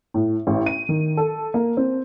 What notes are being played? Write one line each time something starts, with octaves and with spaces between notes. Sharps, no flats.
A2
A1
D#7
D#3
A4
A#3
C4